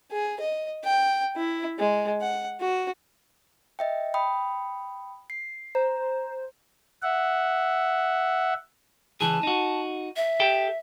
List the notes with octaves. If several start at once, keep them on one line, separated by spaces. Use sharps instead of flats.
G#4
D#5
G5
E4
G#3
F#5
F#4
D#5 E5 G5
G5 B5 D#6
C7
C5 A#5
E5 F#5
C#2 E3 G#4 A5
D#4 F#4
E5
G4 A4 G5